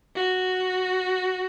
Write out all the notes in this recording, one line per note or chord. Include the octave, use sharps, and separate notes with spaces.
F#4